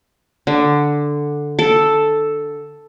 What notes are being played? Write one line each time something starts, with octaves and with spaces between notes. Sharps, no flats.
D3
A4